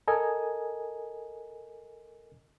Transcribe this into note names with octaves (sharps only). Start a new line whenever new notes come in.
A4 A#4 D#5 G#5